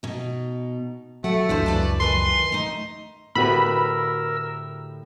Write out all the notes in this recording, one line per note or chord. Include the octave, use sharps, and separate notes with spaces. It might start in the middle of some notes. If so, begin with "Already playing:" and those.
B2 D#4
F#3 A3 F#5
C#2 F#2 E3 D4 F4 C5
B4 D5 A5
D#3 B4 G#5 C6
A3 D#4
D2 A2 F#4 G4 A#4 B4 B5 E6